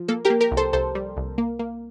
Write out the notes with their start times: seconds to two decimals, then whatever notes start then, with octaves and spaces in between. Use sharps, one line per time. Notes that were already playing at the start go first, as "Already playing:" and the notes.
Already playing: F3
0.08 A#3 A4
0.25 G4 A#4
0.30 A#3
0.41 G4 A#4
0.51 C2
0.57 A4 C5
0.73 C2 A4 C5
0.95 G3
1.17 C2
1.38 A#3
1.59 A#3